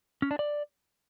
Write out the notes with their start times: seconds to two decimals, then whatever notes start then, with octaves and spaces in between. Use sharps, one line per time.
0.22 C#4
0.31 D4
0.39 D5